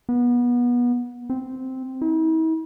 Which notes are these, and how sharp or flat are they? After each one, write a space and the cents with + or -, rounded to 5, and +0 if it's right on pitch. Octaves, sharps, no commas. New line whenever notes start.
B3 -25
C4 -5
E4 -45